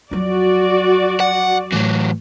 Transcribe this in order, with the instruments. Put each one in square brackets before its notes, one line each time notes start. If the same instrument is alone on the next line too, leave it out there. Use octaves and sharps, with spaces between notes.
[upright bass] F2 F#3 [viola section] F#4 D5
[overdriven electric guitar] F#5
[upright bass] A2 [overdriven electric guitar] E3 F#3